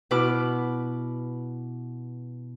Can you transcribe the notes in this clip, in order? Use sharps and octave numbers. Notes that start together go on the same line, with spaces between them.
B2 E4 B4 D6 F6